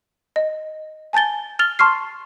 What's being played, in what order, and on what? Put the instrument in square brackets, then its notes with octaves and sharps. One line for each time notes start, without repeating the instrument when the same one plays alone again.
[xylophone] D#5
G#5 A5 G6 A6 G7
F6 A6 F7 G7
A5 C6 C#6 F6 C7